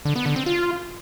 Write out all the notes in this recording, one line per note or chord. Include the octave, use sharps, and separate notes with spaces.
D3
B3
D3
C4
F4